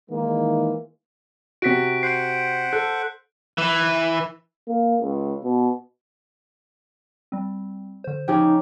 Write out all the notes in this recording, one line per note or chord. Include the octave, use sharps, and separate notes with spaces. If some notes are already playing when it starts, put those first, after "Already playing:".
D#3 E3 G#3 A#3
C3 F#4 B6 D7
C5 F#5 C7 D7
A4 F#6
E3
A#3
C#2
B2
G3 C4
D3 C5
C#3 F3 C#4 D#4 G4